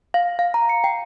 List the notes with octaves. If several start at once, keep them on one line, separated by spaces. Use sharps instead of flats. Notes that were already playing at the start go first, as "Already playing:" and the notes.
F5
F5
A#5
C#7
G5